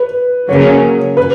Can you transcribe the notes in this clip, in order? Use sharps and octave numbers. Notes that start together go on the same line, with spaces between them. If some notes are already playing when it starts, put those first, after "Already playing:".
Already playing: B4
C#3 F#3 A#3 C#4 C#5
B4